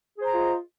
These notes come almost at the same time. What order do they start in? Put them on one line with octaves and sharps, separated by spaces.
G#4 C5 A#5 F4 D#5